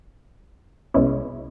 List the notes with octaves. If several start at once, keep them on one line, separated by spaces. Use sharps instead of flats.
C2 B2 G#3 C#4 E4